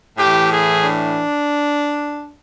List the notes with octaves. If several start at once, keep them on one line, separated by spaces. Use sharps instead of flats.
A2 E3 G4
G#4
D4